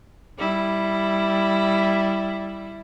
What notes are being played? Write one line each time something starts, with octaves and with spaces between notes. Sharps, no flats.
G3 E4